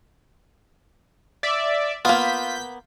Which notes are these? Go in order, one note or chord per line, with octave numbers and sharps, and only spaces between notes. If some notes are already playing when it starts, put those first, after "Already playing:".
D5 E5
A#3 B3 F4 G6 B6